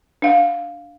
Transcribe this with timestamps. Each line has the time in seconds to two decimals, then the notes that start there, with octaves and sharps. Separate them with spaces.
0.22 D4 F5 F#5